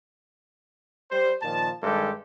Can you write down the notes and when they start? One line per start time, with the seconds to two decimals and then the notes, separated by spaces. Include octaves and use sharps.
1.11 G3 C5
1.42 A#2 D#3 F3 A5
1.83 G2 D#3 G#3 G4 A4